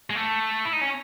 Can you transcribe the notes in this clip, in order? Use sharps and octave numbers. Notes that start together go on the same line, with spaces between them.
G#3
A3
E4
D#4
C#4